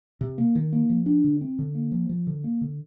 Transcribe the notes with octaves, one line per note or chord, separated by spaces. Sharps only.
C3
A#3
D#3
A#3
F3
D4
D3
C4
D3
A#3
F3
F3
D3
A#3
D3